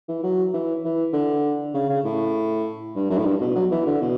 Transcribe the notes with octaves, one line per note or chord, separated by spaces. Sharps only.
E3
F#3
E3
E3
D3
C#3
C#3
A2
G2
F#2
A2
G2
B2
F#3
E3
D3
B2